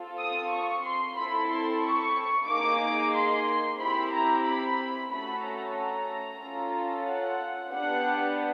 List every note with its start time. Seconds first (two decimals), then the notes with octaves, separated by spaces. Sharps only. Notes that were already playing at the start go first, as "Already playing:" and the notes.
Already playing: C4 F4 A4
0.19 D#6
0.52 C#6
0.85 C6
1.17 C4 E4 A4 B5
1.51 C6
1.84 C#6
2.48 A#3 D#4 G#4 D6
3.14 C6
3.79 C4 E4 G4 B5
4.13 A#5
4.45 B5
5.11 A3 C#4 F#4 A4 B5
5.44 A#5
5.76 A#5
6.41 C#4 F4 A4
7.08 F#5
7.72 B3 D4 G4 F#5